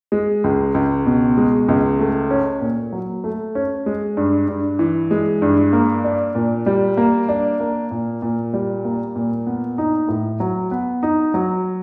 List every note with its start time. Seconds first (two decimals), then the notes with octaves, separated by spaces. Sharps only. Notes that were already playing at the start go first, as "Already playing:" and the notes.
0.12 G#3
0.44 C#2
0.74 C#2
1.06 B2
1.37 G#3
1.69 C#2
1.99 A3
2.31 C#4
2.61 A#2
2.92 F#3
3.24 A3
3.55 C#4
3.86 G#3
4.17 G2
4.48 G2
4.79 E3
5.11 G#3
5.42 G2
5.73 A#3
6.04 D4
6.35 A#2
6.66 G3
6.97 A#3
7.29 D4
7.60 A#3
7.91 A#2
8.22 A#2
8.53 G3
8.85 A#3
9.16 A#2
9.46 B3
9.78 D#4
10.08 A2
10.40 F#3
10.71 B3
11.03 D#4
11.34 F#3